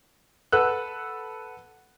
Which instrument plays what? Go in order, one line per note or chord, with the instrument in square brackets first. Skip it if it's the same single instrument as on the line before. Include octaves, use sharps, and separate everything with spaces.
[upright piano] A4 B4 F#5 E6 F#6